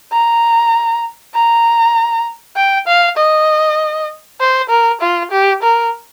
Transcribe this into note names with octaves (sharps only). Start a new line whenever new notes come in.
A#5
A#5
G5
F5
D#5
C5
A#4
F4
G4
A#4